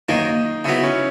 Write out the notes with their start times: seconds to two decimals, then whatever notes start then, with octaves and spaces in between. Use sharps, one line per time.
0.08 F#2 D#3 A#3 D#4
0.64 C#3 F#3 B3 E4
0.83 C#4